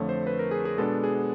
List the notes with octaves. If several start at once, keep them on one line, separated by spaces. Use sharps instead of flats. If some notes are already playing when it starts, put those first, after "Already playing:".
Already playing: F2 D3 F3 A3 C#5
C5
B4
A#4
G#4
G#4
B2 G#3 B3 D4 A4
G#4